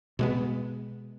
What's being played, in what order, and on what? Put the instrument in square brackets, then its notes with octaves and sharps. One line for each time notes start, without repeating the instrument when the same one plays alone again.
[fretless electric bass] B2 G#3 B3